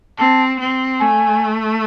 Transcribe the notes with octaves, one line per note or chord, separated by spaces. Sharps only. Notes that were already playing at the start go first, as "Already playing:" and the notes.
C4 A5
C4
A3 G#5